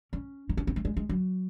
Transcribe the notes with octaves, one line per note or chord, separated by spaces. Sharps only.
C#4
D#4
C#4
C4
A3
G#3
G#3
F#3